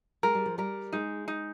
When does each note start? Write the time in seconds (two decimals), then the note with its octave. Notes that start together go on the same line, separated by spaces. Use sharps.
0.23 G#3 A#4
0.35 G3
0.46 F3
0.58 G3 A#4
0.92 G#3 D#4
1.28 D#4